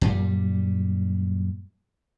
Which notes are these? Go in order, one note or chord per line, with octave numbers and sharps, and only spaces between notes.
F#2 A#2 G3